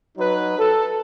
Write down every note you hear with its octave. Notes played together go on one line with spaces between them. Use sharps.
F#3 D#4 B4
A4